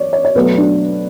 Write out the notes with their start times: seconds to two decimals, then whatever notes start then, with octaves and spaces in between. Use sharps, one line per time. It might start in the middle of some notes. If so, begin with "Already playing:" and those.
Already playing: C#5 D5
0.13 C#5
0.25 C#5
0.35 B2 F#3 A3 B4
0.58 D4